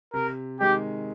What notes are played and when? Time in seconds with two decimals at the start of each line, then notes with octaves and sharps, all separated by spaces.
0.14 C3 A#4
0.60 D#3 G#3 G4